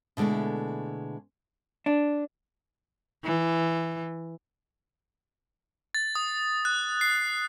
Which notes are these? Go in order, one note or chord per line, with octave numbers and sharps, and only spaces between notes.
B2 D3 G#3 A3 E4
D4
E3
A6
D#6
F#6
C7